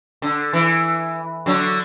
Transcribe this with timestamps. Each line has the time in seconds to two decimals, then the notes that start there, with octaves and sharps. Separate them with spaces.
0.22 D3
0.53 E3
1.46 D3 F#3